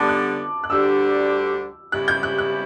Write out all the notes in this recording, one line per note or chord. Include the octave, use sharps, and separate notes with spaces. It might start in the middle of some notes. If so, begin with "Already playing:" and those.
Already playing: D3 G3 B3 A5 D6
F#6
F#6
D2 D3 G3 D4 G4 E6
C#3 G3 B3 E4 G4 F#6
G6
F#6
F#6